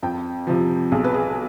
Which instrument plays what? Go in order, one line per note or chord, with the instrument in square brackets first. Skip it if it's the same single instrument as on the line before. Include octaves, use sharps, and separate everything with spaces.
[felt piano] F2 G5
C3 F3
B1 G#4
B4
G#4